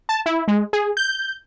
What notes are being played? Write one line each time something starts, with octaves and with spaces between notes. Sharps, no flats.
A5
E4
G#3
G#4
G6